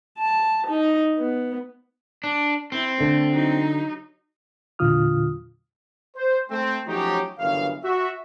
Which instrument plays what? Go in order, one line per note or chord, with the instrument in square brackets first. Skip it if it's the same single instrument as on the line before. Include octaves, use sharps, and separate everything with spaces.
[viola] A5
D#4
B3
[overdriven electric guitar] D4
[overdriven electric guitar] C4 [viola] E4
[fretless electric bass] D3 [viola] A3
[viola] F#3 D#4
[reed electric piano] E2 A#2 D3 F4 D#6 F6
[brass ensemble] C5
A3 C4
F3 F#3 A3 C#4 D#4 G4
G1 F#2 C#3 E3 F5
F#4 E5